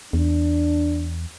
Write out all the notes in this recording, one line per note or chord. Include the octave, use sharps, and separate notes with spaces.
E2 D4